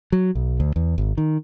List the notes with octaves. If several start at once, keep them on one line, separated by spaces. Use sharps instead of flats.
F#3
B1
D2
E2
G#1
D#3